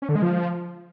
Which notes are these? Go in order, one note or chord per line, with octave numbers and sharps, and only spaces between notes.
C#4
D3
G#3
F3